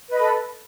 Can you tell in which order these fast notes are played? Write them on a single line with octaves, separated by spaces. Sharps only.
B4 D#5 B5 A4